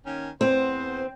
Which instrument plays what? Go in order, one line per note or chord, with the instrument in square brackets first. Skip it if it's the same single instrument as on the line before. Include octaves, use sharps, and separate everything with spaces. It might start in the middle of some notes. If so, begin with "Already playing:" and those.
[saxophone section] D#3 A#3 C#4
[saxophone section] E2 B3 C5 [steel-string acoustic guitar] C4